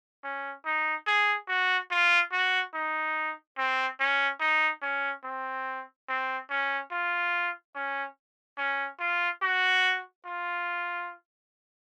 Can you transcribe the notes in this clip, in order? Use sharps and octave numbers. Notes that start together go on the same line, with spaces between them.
C#4
D#4
G#4
F#4
F4
F#4
D#4
C4
C#4
D#4
C#4
C4
C4
C#4
F4
C#4
C#4
F4
F#4
F4